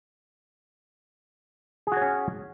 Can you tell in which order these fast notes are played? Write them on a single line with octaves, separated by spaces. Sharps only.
G#4 F#4 C#5 C#4